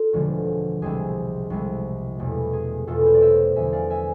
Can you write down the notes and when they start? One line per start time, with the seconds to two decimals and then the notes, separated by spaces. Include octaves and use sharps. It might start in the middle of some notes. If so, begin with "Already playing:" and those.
Already playing: F4 A4
0.13 E1 D2 D3 F3 G#3
0.82 C2 C3 G#3 C4 G#4
1.50 C2 C3 G#3 C4
2.19 E1 E2 B2 A3
2.53 G#4
2.87 E1 E2 B2 A3 F4 A4
3.06 C5
3.14 D5
3.22 C5 E5
3.56 E2 D3 F3 E5 G#5
3.73 D5 F5
3.90 E5 G#5